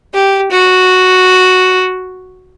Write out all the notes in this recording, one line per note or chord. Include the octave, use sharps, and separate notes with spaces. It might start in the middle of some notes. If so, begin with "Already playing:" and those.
G4
F#4